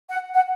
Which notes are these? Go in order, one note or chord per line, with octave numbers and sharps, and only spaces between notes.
F#5
F#5